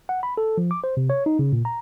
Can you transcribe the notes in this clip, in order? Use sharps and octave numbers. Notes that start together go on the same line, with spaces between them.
F#5
B5
A4
F3
D6
C5
C3
C#5
D#4
C#3
A#2
A#5